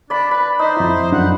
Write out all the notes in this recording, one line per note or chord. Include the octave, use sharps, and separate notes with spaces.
D4 D5 B5
B4 B5
D#4 C5
F2 E4
F#2 D4 F#5